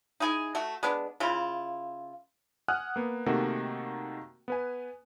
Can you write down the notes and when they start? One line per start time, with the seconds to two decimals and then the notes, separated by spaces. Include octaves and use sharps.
0.20 D#4 E4 G#4 G#5
0.55 A3 F#4
0.83 G#3 B3 D4
1.20 C#3 E4 F4
2.68 F#5 G#5 D#6 F6 F#6
2.96 A#3 B3
3.26 C3 D#3 A3 A#3 F#4
4.48 B3 B4 G#5